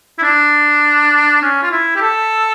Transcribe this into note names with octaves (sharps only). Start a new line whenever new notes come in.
E4
D4
C#4
F4
E4
G4
A4